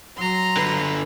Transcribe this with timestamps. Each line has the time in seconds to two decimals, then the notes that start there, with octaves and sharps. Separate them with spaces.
0.17 F#3 A#5 C6
0.57 D3 B4